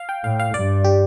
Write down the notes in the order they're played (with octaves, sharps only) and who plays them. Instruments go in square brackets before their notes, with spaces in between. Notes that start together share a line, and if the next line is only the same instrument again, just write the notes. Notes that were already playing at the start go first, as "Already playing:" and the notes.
Already playing: [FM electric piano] F5
G5
[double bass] A2 [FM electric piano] F5
[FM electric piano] F5
[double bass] G2 [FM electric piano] D5
[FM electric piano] G4